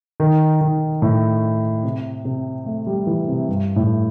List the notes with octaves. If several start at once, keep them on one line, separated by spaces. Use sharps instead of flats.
D#3
D#3
A2
C3
C3
A3
G3
E3
C3
G2
A2